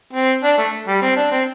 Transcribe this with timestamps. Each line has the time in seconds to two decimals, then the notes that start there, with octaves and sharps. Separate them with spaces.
0.13 C4
0.43 D4
0.58 A3
0.87 G3
1.02 C4
1.16 D4
1.31 C4